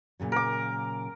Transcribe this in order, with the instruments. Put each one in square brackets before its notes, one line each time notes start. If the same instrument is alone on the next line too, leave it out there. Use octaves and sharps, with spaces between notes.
[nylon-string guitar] A#2 C#3 F#3
[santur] A#4 D6